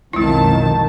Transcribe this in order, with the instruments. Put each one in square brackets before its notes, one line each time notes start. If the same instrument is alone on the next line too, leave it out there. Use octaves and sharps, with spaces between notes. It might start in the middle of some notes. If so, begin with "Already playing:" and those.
[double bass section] B1 D#3 [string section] F2 A5 [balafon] G#3 E4